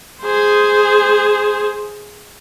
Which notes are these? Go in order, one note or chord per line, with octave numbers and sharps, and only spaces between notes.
G#4 C5